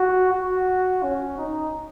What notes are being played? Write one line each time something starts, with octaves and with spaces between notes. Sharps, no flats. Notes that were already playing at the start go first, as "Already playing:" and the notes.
Already playing: F#4
F#4
C#4
D#4